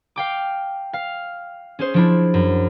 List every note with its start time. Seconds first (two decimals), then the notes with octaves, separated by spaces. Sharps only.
0.16 F5 G5 D6
0.93 F5
1.79 C#4 G#4 C5
1.94 F3 D4 E4
2.34 F#2